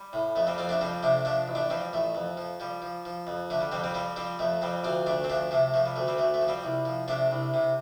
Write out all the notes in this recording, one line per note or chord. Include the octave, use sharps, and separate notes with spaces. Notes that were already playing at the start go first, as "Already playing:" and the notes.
Already playing: G3
A2
F2 A3
G3 C4
F2 C4 F4
A3 D4
F3 G3 C4
C3 A3 D4
F3 A3 D4
A1
A3 D4
F3 G3 C4
A1 A3
F2
F3
F3 G3
F3
F3
F2
D3 A3
G3
F2 G3 C4
G3 C4
F3 G3 C4
F3 G3 C4
F2 A3
F2 G3 C4
D2 C4 F4
D2 A3 D4
C4
F3 A3 D4
C3 A3
F3 A3
G3
D2 A3
G3 C4
D2 A3
A3
F3
G3 C4
C2
F3
C3 A3 D4
C2
C3